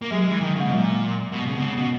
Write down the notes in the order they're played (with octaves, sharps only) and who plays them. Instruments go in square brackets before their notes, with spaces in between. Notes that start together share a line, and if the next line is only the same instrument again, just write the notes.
[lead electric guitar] A#3
[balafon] F#3 [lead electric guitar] G#3
[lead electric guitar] G#3
E3
D#3
[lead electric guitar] C#3 [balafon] G#3
[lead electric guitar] B2
[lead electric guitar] A#2 [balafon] F#3
[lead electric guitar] B2 [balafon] G#3
[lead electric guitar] C#3
B2
[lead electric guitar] C#3 [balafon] B3
[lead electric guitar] B2 [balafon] C#4